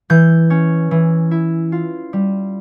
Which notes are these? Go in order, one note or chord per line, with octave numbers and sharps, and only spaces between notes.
E3 G6
C#4
E3
E4
F4
G3